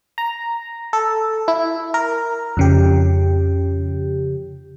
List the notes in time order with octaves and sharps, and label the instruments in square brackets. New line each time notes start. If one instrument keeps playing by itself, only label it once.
[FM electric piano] A#5
A4
E4
A#4
F2 C#3 G4